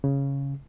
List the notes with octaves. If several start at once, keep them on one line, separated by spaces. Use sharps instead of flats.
C#3